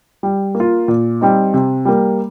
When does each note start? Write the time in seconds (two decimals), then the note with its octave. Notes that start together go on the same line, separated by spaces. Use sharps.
0.23 G3
0.55 A#3
0.60 F4
0.88 A#2
1.21 G3 C4 D#4
1.54 C3
1.85 G3 A#3